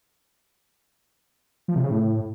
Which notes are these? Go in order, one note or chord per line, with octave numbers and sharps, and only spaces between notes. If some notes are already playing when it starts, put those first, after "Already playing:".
F3
C3
C#3
A2